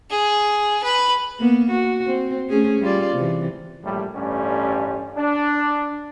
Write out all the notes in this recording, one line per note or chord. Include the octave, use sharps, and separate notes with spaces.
G#4
B4 B5
A#3 B3
F#4
C4
A3 C#4 G#4
G3 F4 D5
C3 E3
A#1 A2 G3
A1 G2 G3 A3 C#4
D4